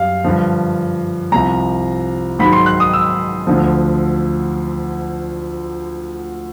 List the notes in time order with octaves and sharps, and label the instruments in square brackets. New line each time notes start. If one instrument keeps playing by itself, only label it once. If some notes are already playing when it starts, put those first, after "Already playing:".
Already playing: [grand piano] F#2 G3 F5
G2 D3 F3
C2 C3 F3 A#5
G#2 D#3 F#3 B5
C6
F#6
D#6
E6
D2 D3 F3